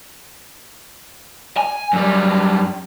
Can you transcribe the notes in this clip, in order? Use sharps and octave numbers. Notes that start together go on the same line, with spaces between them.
G#5
F#2 G3